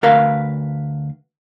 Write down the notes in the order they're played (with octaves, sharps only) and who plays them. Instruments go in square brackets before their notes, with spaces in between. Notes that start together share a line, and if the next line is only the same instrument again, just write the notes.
[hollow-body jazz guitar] D2 A#4 B4 F5